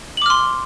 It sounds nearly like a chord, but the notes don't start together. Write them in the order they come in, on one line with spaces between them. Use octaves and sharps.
F#7 D6 F6 C6